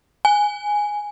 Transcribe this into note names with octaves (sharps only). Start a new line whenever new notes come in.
G#5